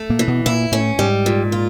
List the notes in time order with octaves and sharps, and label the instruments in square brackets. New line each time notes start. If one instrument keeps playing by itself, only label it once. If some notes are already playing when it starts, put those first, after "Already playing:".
Already playing: [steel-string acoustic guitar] A3
[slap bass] A#2 A#3
[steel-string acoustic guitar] E3
[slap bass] B2 B3
[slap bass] A#2 A#3 [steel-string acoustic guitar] E4
[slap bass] A2 A3 [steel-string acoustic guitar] C#4
[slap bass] G#2 G#3 [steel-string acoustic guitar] G3
[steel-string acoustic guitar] A#2
F4